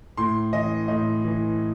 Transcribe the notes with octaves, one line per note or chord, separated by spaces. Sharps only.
A2 C6
E3 D#5
A2 D#5
E3